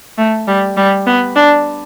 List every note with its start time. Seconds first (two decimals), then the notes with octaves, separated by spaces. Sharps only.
0.18 A3
0.48 G3
0.77 G3
1.07 B3
1.36 D4